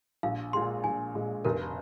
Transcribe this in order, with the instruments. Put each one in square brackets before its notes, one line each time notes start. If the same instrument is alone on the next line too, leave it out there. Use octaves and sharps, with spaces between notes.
[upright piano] A#1 [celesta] F5
[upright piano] A#2 G#3 [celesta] C6
[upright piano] A#1 [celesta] G#5
[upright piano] A#2 G#3
[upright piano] F1 [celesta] A#4